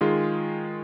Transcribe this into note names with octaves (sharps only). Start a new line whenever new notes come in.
D#3 G#3 F4 G#4